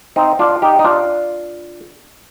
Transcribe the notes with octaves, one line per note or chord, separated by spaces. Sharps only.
C4 D#4
D4 F4
D#4 G4
D#4
D4 F4